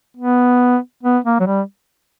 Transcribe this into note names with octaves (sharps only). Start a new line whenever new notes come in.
B3
B3
A#3
F#3
G3